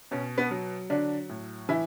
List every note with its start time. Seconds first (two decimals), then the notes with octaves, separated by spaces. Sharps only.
0.11 B2 C#4
0.38 B3
0.51 F#3
0.90 D3 F#3 D4
1.29 A2
1.69 E3 E4